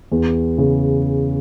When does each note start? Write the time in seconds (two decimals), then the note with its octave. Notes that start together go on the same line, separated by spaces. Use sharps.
0.11 E2
0.58 C#3